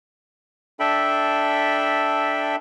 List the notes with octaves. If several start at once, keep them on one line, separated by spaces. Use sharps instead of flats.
D4 A4 E5 G5 B5